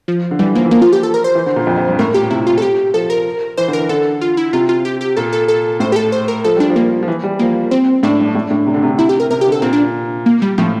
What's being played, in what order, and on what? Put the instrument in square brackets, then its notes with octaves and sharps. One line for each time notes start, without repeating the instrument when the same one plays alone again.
[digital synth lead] F3
[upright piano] D3
[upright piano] E3 [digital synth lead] G3
[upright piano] F3 [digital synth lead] A#3
[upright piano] E3
[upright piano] F3 [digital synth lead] A#3
[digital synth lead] F4
G4
A4
A#4
C5
[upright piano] E3
D3
A#2
F2
F2
G2
[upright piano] A2 [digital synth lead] A#4
[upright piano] A#2 [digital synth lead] G4
[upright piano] C3 [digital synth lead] E4
[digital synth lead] F4
A4
G4
[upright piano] F3 [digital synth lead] A4
[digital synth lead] A#4
[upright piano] E3 [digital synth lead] C5
[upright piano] D3
[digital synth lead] A#4
[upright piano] E3
[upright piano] D3 [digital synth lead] A4
[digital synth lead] F4
E4
[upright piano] C3 [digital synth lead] F4
[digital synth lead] F4
G4
G4
[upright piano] A#2 [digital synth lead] A4
[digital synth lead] A4
A4
[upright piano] A2 [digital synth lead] C5
[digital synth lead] G4
A4
C5
A#4
[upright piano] F3 [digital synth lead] A4
[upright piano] G3 [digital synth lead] D4
[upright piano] F3
[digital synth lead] A#3
[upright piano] F3
E3
G3
[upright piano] F3 [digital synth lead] A#3
[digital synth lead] C4
[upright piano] A2 [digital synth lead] D4
[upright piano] G2
A2
A2
C3
D3
C3
D3
[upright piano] C3 [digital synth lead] E4
[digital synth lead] G4
A#4
[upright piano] C3 [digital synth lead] A#4
[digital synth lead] G4
[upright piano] D3
[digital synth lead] A4
[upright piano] A#2 [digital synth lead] C4
[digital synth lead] D4
A#3
G3
[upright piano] A2 [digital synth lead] F3